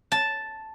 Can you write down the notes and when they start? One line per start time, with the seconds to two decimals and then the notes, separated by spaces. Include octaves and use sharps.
0.12 A5